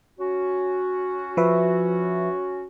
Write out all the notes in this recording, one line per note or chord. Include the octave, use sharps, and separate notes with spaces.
C#4 F#4
F3 B4 E5